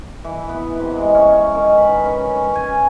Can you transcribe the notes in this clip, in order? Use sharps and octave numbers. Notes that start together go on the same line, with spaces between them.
E3
B3
C3
G#3
C#4
D#3
B4
C#4
C#4
G#5